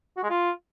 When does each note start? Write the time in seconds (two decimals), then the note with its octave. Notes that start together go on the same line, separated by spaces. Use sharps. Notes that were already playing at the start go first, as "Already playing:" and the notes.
0.17 F#4
0.23 G#3
0.30 F4